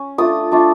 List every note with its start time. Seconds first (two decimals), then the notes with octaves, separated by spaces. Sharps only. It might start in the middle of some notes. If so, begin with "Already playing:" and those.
Already playing: C#4
0.18 A3 D4 F4 D#6
0.52 A3 D4 F4